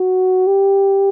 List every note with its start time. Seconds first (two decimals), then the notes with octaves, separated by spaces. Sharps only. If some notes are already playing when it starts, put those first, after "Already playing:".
Already playing: F#4
0.47 G4